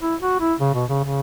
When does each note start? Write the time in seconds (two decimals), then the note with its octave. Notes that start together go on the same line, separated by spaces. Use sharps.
0.01 E4
0.22 F#4
0.40 E4
0.60 C#3
0.74 B2
0.89 C#3
1.04 C#3